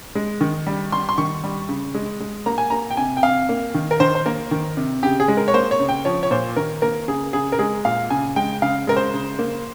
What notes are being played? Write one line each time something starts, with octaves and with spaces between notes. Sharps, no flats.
G#3
D#3
G3
G3 C6
C6
D#3 C#6
G3
C#3
G#3
G#3
A#3 A#5
G#5
A#3 A#5
G5
C3 G#5
G5
C3 F5
A#3
D#3
A#4
D#3 C5
C5
A#3 A#4
D#3
C3
C#3 G4
G#4
G#3
A#4
C#5
A#3 C5
C#5
C#3
G5
F3 C#5
C#5
A#2 C5
D#3 A#4
A#3 A#4
C#3 G#4
C#3 G#4
A#4
G#3 G#4
A#2 F5
C#3 G#5
G#3 G5
C#3 F5
G#3 A#4
C5
C#3
A#3